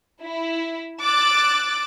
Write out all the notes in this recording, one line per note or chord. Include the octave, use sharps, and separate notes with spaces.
E4
D6 E6 F#6 A6